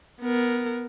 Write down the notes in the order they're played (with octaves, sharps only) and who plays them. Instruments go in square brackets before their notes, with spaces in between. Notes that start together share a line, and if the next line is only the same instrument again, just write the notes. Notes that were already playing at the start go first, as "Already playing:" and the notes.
[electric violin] B3 A#4